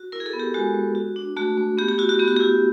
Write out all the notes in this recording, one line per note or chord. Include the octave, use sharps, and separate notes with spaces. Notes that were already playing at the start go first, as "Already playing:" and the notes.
Already playing: F#4
E4 A#4
G#4
A4
B3
G4
G#3 F#4
G#3
F#4
D4
A3 F#4
A3
B3 G4
G4
E4 F#4
F#4
B3 G4
F#4
E4 G4